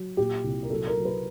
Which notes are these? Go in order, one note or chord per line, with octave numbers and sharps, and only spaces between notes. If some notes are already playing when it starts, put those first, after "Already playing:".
Already playing: F#3
A#2 G4
C2
A#4
F#3 A4
A#4
F#3
B4